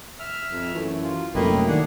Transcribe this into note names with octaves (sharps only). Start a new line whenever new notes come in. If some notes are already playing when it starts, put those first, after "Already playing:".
E5 F6
F2
F#2 E3 A3
F4
C2 F#2 A2 A3 A#3 B4 D#5 G5
D#3 D4 G#4 F#5